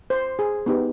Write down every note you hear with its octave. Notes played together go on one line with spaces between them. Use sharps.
C5
G#4
B3 D#4 G4